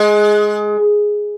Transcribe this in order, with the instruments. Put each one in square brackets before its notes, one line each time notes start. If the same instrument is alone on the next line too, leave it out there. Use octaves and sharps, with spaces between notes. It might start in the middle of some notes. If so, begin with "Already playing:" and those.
Already playing: [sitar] G#3